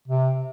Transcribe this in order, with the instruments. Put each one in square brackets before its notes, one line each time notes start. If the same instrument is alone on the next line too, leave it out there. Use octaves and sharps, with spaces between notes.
[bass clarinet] C3